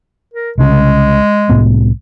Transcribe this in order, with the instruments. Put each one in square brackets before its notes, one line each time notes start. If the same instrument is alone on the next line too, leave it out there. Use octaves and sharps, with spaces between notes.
[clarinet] A#4
[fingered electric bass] C2 C#3 [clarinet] G#3
[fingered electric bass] C2 A2 B3